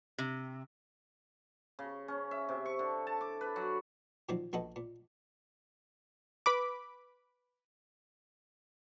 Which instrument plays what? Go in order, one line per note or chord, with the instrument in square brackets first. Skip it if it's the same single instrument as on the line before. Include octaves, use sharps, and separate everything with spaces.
[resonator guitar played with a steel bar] C3
[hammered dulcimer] C#3
C#4
E5
C3
C#6
D3
A5
D6
B4
F#3
[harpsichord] A#2 D#3 F3 F#3 C4
A#1 B3 F#4 A4 B4 D#5
A#2
[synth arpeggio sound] B4 B5 D6